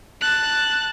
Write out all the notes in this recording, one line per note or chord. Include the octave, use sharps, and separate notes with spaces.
A5 F#6